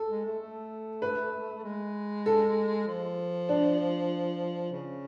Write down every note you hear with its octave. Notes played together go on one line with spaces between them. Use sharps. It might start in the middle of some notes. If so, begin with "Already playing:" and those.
Already playing: A4
G#3
A3
A3
B4
G#3
A4
F3
D4
C#3